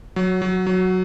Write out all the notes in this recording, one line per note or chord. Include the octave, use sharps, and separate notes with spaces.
F#3
F#3
F#3